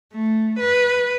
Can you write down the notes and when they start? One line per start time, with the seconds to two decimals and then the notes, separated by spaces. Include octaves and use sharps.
0.13 A3
0.59 B4